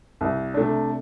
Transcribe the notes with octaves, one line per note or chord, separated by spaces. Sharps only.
C2
C3 A3 D4